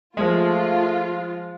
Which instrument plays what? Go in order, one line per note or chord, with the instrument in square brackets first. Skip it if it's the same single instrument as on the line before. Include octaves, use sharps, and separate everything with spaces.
[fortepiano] F3 G#3 [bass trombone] A3 [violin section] F4